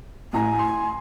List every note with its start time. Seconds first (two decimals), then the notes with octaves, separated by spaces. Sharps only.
0.33 A1 G#5 A#5
0.59 C6